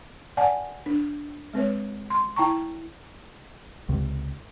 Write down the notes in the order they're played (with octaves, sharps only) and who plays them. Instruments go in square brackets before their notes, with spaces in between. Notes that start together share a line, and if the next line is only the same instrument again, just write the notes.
[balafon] D5 F#5 G#5 A5
D4
G#3 C4 B4 C#5
C6
E4 G5 A5 A#5 C#6
[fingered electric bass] C#2 C3